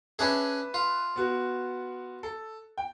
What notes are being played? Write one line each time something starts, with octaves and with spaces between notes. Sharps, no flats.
C#4 D4 G#4 B4 E5
F4
B3 F#4
A4
G5